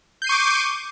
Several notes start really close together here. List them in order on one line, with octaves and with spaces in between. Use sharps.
G6 C7 D#7 C#6 D6